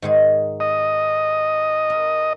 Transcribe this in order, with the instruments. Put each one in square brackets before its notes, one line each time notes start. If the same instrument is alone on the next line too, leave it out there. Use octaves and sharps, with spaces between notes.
[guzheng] G#2 D#3 G#4
[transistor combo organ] D#5
[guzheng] A#4